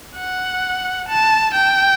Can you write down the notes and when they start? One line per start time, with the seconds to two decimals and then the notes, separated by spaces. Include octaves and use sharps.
0.16 F#5
1.08 A5
1.54 G5